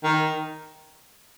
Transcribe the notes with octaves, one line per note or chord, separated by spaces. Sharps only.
D#3